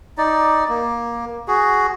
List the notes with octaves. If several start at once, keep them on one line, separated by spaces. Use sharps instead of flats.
D#4 D5
A#3
F#4 G#4